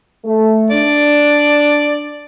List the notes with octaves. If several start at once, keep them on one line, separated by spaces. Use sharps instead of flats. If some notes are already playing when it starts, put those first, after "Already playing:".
A3
D4 D5